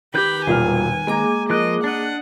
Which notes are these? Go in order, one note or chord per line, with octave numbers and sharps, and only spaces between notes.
D#3 G4 B4 B5 G6
E1 A#2 G3 G#5 F6
G#3 A#3 G#4 A#5 D6
F3 A#4 D#5 F#6
D4 D#5 F#5